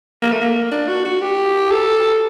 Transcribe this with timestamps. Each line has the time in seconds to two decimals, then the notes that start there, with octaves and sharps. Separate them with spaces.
0.22 A#3
0.32 A3
0.41 A#3
0.71 D4
0.88 F#4
1.05 F#4
1.21 G4
1.71 A4